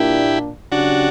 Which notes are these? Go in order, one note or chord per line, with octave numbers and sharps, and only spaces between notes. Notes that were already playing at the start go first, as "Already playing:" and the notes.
Already playing: A#2 A#3 D4 E4 G4
C#3 F#3 C#4 D4 F#4 G4